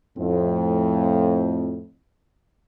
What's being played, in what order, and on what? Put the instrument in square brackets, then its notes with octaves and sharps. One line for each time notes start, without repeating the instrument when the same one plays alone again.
[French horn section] F2 A2 C4